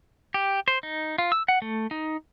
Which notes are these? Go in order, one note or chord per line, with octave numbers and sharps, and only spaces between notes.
G4
C5
D#4
F4
E6
F#5
A3
D#4